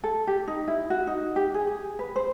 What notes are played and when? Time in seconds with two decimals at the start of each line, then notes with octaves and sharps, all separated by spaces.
0.04 A4
0.27 G4
0.47 D#4
0.67 E4
0.90 F#4
1.07 D#4
1.36 G4
1.54 G#4
1.67 G#4
1.99 B4
2.16 C5